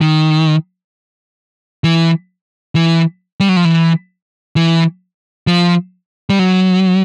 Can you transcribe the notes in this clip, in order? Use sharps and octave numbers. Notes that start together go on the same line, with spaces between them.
D#3
E3
E3
G3
F#3
F3
E3
E3
F3
G3
F#3